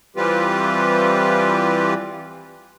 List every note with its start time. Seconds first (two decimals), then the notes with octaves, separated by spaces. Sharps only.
0.16 E3 G3 C4 F4 G4 B4